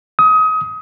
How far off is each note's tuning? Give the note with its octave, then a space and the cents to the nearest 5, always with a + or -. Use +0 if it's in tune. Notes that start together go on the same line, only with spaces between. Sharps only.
D#6 +25